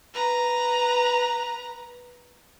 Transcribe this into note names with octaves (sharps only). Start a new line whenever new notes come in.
B4 A#5